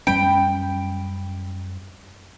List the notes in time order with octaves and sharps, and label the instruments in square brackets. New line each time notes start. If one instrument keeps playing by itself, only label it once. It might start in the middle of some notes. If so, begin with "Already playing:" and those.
[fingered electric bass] F#2 G3 C#4 [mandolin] G5 B5